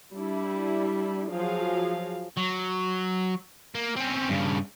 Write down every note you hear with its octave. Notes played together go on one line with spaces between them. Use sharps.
G3 D4 E4
F3 F#3 G#4 F5
F#3
A#3
C4 C#4
G2 C#3